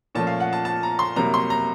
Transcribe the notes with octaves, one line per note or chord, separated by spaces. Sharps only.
A#2 F3 A3 C#4 A5
F5
F#5
A5
A5
A#5
C6
C2 C3 F#3 A#3 A#5
C6
A#5